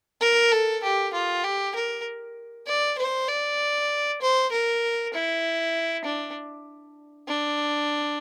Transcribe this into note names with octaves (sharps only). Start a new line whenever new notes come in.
A#4
A4
G4
F4
G4
A#4
D5
C5
D5
C5
A#4
E4
D4
D4